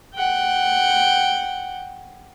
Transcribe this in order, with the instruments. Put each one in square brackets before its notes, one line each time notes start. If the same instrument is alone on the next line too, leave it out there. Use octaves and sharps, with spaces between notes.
[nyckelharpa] F#5 G5